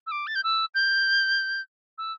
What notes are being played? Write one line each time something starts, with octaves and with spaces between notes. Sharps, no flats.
E6
D6
A6
G6
E6
G6
E6